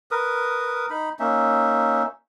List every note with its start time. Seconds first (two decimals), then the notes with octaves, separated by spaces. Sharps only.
0.11 A#4 B4 D#6
0.90 D#4 B5
1.19 A#3 C#4 D#4 E5